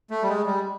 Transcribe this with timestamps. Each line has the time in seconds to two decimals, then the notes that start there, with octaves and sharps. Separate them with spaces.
0.10 A3
0.23 G3
0.29 G#3
0.47 G3